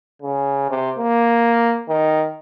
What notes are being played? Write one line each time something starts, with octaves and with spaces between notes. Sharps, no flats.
C#3
C3
A#3
D#3